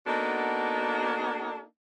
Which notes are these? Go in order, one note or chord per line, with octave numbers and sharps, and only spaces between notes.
A#3 B3 D4 D#4 F#4 A4